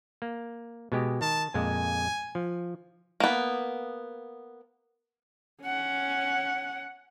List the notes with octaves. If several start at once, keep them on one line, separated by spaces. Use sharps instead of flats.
A#3
B2 G#3 G4
D#3 A5
F2 A#2 G#3 G#5
F3
A#3 B3
C#4 F#5